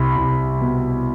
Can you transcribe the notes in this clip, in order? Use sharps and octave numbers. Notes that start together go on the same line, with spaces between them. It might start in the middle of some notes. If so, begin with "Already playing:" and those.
Already playing: C2 B5
C2
B2